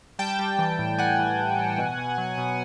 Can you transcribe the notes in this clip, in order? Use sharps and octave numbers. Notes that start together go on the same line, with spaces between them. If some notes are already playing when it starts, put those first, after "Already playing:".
G3 G5 A5
G3
E3
A2
G3 F#5 G#5
E3
E3
E3
B2
B2
F#3
B2